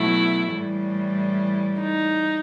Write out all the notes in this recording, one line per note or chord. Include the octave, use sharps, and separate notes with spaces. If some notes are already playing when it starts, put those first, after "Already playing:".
Already playing: B2 F#3 A3 E4
A2 E3 G3
D#4